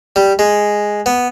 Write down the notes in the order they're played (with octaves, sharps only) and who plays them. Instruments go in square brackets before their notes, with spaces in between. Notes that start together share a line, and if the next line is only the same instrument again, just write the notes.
[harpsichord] G3
G#3
B3